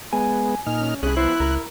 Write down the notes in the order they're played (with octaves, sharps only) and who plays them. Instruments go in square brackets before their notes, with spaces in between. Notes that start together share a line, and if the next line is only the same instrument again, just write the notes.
[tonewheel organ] G#3 B3 [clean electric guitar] G#5
[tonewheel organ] A#2 D#4 F6
[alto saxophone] C#4
[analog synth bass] C2 [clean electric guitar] C#4 E4 [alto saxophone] G#4 [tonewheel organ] F#6
[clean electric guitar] F3 B3 C5 [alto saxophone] E4
[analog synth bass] C#2 [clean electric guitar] A#4